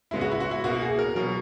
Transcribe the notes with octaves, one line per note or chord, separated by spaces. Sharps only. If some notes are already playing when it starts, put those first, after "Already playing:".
C#3 G#3 B3 E4
F#4
E4
F#4
E4
B2 A#3 F#4
G#4
A#4
B2 F#3 A#4